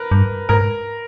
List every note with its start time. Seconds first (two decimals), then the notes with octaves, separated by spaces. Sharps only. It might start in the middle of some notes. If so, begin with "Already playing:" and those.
Already playing: A#4 B4
0.11 G2
0.49 G#2 A#4